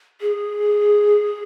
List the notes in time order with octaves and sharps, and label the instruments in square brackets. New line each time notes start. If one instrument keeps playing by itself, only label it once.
[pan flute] G#4